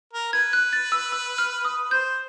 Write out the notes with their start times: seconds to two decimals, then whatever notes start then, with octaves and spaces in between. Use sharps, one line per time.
0.13 A#4
0.33 B4 G#6
0.53 F#6
0.73 A6
0.92 E6
1.12 E6
1.38 F6
1.65 D#6
1.91 C5 G6